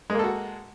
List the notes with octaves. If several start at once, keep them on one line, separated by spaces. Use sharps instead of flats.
G#3 A#3 F#4 A4